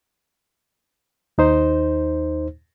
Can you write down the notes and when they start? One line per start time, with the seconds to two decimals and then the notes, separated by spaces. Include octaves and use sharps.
1.38 D#2 D#4 C5